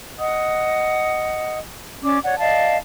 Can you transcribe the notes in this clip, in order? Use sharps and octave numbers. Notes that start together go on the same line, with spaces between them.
D#5 F#5 D#6
C#4 D5 D6
C#5 D5 F#5
D5 D#5 F5 A5